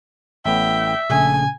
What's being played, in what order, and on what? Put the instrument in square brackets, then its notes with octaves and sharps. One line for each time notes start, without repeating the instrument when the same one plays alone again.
[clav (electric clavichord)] A1 A2 B3 [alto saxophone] E5 [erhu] G5
[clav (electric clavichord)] A#1 A3 G#4 [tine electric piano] A#2 C#3 C#4 [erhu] G#5